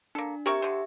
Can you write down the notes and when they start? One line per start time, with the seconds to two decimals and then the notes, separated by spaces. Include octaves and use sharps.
0.15 A#3 D4 A4
0.46 C4 G4 A#4 E5 C#6
0.62 D3 C5